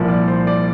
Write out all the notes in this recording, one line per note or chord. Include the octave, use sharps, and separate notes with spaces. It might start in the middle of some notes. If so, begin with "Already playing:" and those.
Already playing: C2 A#2 F3
D5
C5
D5